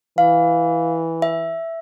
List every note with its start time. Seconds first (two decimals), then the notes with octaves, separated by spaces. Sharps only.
0.18 E3 F5
1.22 E5